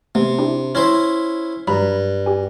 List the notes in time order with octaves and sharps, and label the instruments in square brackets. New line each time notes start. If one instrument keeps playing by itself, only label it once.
[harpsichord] C3 [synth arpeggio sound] A3 B3
[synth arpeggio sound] D4 E4 G4
[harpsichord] C#4 E4 C5 [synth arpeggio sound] G#6 A#6
[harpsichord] G2 [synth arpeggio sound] F#3 A#5 B5
[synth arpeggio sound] G4 G#5